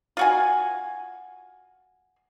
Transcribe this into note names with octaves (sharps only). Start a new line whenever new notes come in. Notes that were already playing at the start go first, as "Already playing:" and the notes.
F4 F#4 G#5